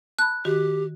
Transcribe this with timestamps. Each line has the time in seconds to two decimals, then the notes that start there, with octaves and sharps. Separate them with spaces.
0.19 A5 B5 F#6
0.45 D#3 F#4 G4